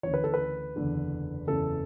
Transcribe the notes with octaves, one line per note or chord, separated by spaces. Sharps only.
D2 C#3 E3 C#5
B4
A4
B4
F#1 E2 D3
F#1 E2 C#3 E3 A4